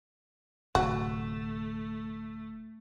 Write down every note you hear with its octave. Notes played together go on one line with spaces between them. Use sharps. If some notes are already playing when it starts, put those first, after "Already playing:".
D1 C3 A3 F#4